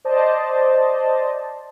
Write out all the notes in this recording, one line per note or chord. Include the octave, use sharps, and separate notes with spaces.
C5 D5 D#5 A5